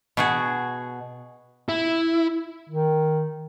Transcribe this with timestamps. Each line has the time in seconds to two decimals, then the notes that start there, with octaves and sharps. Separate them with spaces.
0.17 B2 F#4 G#4
1.69 E4
2.69 D#3